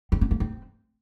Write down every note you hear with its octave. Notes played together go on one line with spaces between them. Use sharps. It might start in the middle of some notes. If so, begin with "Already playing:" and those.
C4
C#4
A#3
C4